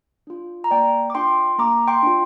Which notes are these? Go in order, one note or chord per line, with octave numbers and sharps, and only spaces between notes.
D4 F4
A#5
A#3 D5 G5
D6
D4 F4 G5 C6
A#3 A#5 D6
G5 C6
D4 F4